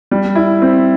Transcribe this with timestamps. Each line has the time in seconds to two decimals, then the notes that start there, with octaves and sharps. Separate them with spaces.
0.11 G3
0.35 E4
0.62 C4